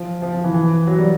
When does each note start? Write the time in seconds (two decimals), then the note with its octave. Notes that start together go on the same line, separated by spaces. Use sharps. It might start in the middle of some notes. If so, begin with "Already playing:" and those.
Already playing: F3
0.22 F3
0.33 F3
0.44 E3
0.54 E3
0.87 F#3
0.98 G3